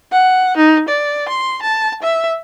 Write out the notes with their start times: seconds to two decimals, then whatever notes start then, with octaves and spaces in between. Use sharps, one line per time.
0.12 F#5
0.57 D#4
0.88 D5
1.28 C6
1.62 A5
2.02 E5